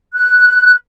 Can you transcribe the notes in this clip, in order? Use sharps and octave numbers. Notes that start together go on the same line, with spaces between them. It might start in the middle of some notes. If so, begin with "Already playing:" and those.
F#6